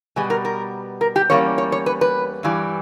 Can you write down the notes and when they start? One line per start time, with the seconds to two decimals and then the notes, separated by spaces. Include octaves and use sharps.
0.16 B2 G3 B3 G#4
0.30 A#4
0.45 A#4
1.01 A#4
1.16 G4
1.30 E2 B2 G3 A#3 C#4 C#5
1.58 C#5
1.72 C#5
1.86 B4
2.01 B4
2.43 G2 E3 G3